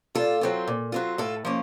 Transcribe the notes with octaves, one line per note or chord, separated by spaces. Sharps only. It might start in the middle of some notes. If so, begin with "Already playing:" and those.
A#2 F4 A4
F#3 C4 F4
A#2
F#3 C4 F4
A2 F4 A4
F3 A#3 C#4